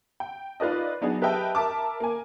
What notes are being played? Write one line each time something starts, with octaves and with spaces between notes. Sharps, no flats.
G5
D#4 F4 B4 D5 D#5
F#3 B3 D4 D#4 G#4
G4 B4 D#5 E5 G5 A5
A#4 E5 A5 D6
A#3 G#5